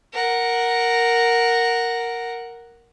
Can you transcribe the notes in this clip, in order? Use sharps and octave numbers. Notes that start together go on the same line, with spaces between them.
A#4 F#5